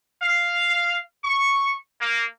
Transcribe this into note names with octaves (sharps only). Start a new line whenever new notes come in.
F5
C#6
A#3